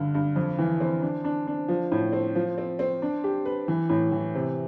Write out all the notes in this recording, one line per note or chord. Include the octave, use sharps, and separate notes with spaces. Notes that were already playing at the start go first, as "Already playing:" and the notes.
Already playing: G2 D3
G2
F2
E3
C4
D4
D4
D4
F3
A2
C4
F3
C4
C4
D4
G4
B4
E3
A2
E3
C3